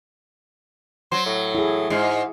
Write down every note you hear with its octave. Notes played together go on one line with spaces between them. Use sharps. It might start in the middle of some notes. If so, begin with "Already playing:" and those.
F#3 C5
A2
E4 G#4
G#2 G#3